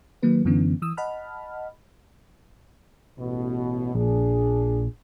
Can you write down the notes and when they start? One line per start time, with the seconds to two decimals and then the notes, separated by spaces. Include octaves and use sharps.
0.23 D#3 F#3 A#3 B4
0.45 F#2 D3 E3 B3 C#4
0.82 E3 D#6 E6
0.97 D#5 F#5 A5 B5 F6
3.18 A1 B2
3.95 A#1 A#2 D4 G#4